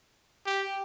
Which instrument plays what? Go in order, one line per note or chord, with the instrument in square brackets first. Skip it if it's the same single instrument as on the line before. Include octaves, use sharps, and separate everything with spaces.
[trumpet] G4